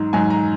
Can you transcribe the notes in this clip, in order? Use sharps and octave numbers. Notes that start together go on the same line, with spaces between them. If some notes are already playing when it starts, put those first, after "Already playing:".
Already playing: G#2 F#3
G#2 F#3 G#5
A#5